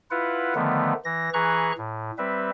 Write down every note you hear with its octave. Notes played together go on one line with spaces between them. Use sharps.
E4 F4 B4 F#5
D3 D#3 F3 A3 B3
E3 A#6
E3 G#4 B4 A#5 C#6 F#6
A2
G3 C4 B4 E5